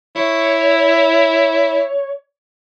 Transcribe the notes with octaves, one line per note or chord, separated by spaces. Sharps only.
E4 C#5